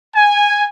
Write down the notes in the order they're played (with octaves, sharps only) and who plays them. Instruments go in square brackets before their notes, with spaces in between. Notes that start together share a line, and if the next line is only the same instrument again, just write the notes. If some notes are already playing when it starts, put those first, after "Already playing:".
[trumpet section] G#5